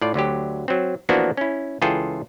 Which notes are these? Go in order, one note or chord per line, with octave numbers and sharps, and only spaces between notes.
A2 F4 D5
D2 D3 F#3 G4
F#3 C4
E3 F3 A#3 B3 D4 F#4
C#4 E4
C#2 E3 F4 G#4 A4 G5